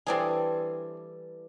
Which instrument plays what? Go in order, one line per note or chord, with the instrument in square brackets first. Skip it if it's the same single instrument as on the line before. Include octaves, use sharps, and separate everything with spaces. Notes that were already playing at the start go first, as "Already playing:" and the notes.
[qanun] E3 G3 A4 [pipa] C4 D4 G#4